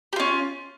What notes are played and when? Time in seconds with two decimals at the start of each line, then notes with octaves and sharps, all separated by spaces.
0.13 G4
0.16 F4
0.20 C#4